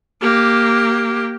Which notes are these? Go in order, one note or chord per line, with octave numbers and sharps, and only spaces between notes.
A#3 G4